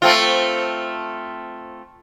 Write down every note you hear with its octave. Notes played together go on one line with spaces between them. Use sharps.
A3 C4 F4